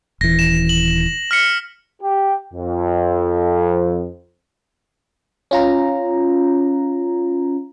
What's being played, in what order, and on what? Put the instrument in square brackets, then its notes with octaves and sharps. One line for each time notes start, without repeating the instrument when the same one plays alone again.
[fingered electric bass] D#1 E3 [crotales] A#6
[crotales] E7
F#7
F6 B6 C#7
[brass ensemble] G4
F2
[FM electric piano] C#4 F4 A#5